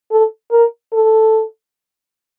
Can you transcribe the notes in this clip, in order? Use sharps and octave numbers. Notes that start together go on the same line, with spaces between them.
A4
A#4
A4